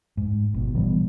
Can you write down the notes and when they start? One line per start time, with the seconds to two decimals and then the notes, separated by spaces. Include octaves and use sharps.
0.17 G#2
0.54 G#1 B2
0.74 B2 E3 G3 B3